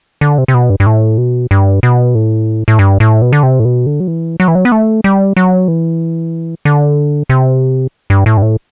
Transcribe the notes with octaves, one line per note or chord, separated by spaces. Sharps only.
D3
C3
C3
B2
G2
G2
A2
B2
G2
B2
A2
A2
G2
A2
B2
D3
C3
A2
B2
D3
F#3
E3
F#3
E3
F#3
B3
A3
G3
F#3
E3
D3
C3
G2
A2
G2
A2